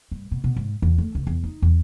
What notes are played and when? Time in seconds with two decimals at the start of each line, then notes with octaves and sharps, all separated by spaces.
0.12 G2
0.31 B2
0.44 B2
0.56 G#2
0.82 E2
0.98 A3
1.15 C#2
1.27 E2
1.43 D#4
1.62 E2